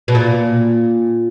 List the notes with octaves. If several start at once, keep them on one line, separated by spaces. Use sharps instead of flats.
B2
A#2